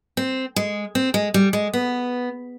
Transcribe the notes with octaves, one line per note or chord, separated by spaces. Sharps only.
C4
G#3
C4
G#3
G3
G#3
B3